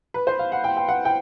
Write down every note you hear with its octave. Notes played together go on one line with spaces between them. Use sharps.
B4
C5
F5
F#5
G5
G5
F#5
G5